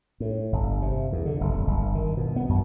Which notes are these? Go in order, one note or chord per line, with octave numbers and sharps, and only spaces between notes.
A2
G1
C3
E2
D3
F#1
D#1
G1
D#3
B2
B3
F#2